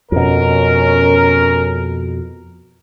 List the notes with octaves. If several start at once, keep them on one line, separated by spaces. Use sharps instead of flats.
F2 B2 C#4 A#4